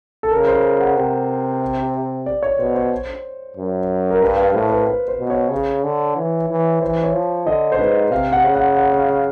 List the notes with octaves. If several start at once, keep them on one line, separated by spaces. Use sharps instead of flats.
A4
C#3 A#4
C5
F#5
C3 G5
D5
C#5
B2 C5
C5
F#2
A#4
G2 B4
F5
A2 C5
B4
B4
C5
B2
C#5
C#3
D3
E3
E3
E3 C5
C#5
F3
D3 D#5
C5
G#2 B4
C3 F5
F#5
C#3
F#5
F#5
F5
F5